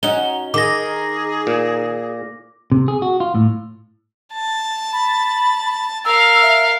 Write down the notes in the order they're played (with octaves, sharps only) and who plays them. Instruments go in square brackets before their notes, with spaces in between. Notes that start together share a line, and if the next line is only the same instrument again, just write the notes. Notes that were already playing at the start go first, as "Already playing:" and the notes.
[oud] C#4 D#4 F#4 [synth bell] G7
[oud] D#3 [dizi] G#4 [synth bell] D6 A#6
[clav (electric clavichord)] A#2
[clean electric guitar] C3
G#4
F#4
F4
A2
[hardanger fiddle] A5
[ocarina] B5
[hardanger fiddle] A#4 F5 [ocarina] E6
[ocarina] E5